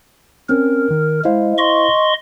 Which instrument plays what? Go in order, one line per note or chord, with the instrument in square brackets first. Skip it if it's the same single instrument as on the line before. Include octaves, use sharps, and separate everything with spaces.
[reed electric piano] C4 C#4 [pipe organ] A#4
[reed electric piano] D#3
[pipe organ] G#3 [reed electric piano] E4 C5 F5
[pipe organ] D#5 C6 C#6